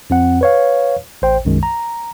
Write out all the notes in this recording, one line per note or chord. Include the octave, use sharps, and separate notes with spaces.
F2 C4 F#5
B4 C#5 F5
A1 C5 G5
B1 F#2 D#3 G#3
A#5